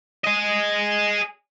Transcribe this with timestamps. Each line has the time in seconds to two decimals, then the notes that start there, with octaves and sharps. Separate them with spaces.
0.24 G#4 D#5